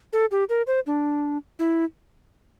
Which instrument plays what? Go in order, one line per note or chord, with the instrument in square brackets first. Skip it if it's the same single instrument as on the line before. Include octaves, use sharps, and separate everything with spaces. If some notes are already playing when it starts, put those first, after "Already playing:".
[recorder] A4
G4
A#4
C5
D4
E4